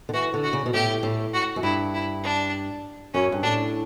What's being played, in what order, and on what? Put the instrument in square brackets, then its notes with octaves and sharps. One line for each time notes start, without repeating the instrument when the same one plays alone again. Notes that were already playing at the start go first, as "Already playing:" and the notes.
[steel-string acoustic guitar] D3
[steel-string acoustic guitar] E3 [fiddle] F#4
[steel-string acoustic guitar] D3
[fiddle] F#4
[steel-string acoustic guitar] C#3
B2
[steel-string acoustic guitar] A2 [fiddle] G4
[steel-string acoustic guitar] A2
[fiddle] F#4
[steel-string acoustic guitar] F#2
[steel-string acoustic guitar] G2 [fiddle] E4
[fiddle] E4
D4
[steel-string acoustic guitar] F#2 [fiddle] C#4
[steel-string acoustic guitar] G2
[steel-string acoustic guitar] A2 [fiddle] D4